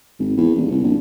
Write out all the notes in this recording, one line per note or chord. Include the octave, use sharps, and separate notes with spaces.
G#1
E2
D#1
C2
A#1